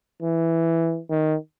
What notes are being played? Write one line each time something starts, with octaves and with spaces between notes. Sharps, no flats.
E3
D#3